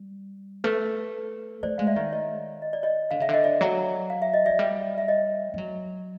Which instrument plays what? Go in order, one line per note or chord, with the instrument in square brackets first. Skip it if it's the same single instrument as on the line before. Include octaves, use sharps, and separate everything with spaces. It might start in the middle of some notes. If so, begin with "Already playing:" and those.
Already playing: [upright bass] G3
[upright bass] A3 [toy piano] B4
[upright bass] A3 [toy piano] C5 D5
[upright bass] G#3 [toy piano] F5
[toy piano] D5 E5
[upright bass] D#3
[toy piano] C#5 D#5
D#5
D5
C#5 D#5
[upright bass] D3 [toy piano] F5
[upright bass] C#3 [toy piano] E5
[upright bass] D3 [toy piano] D#5
[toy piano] D5 E5
[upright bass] F#3
[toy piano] F5
E5
D#5
[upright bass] F#3 [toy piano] D5 E5
[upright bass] G3
[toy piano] E5
C#5 D#5
[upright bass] G3
F#3